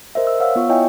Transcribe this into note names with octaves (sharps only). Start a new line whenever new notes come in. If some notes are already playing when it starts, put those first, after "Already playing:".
A#4 C5 D#5 E5
E6
C#5 F5 F#5 E6
B3 F4 C#6
E4 C#5 D#5 E5 G5 G#5